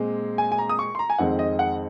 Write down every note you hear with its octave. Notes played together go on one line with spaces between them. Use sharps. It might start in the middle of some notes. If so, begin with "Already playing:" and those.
Already playing: A#2 G#3 C4
G#5
G#5
A#5
D#6
C#6
C6
A#5
G#5
F2 D#3 G#3 C4 F#5
D#5
F#5